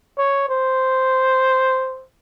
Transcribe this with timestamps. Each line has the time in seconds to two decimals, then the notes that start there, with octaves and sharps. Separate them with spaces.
0.18 C#5
0.49 C5